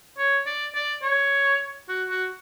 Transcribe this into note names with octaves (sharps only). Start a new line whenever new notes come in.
C#5
D5
D5
C#5
F#4
F#4